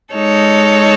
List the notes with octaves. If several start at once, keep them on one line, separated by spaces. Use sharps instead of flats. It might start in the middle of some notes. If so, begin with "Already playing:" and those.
G#3 D#4 A4 C#5